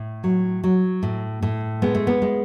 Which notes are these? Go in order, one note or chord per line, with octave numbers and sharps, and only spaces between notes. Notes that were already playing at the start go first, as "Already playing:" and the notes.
Already playing: A2
F#3
F#3
A2
A2
G#3 B3
A3
B3
G#3